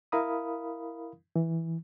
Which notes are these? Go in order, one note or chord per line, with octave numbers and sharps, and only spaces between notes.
E4 A#4 F5 B5 D#6
E3